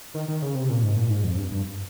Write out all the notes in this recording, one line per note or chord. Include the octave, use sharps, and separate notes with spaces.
D#3
D#3
C#3
C3
A#2
G#2
A#2
G#2
F2
G2
G2